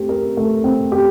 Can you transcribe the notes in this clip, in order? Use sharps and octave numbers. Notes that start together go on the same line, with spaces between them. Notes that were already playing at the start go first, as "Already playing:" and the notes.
Already playing: A3 C4 G4
A#4
A3
C4
G4